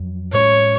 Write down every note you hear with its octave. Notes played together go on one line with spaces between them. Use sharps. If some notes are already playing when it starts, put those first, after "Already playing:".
Already playing: F2 F#3
A2 G#3 C#4 C#5